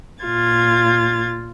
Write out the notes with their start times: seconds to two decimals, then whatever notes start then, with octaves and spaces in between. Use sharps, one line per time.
0.24 A#2 F4 G#6 A6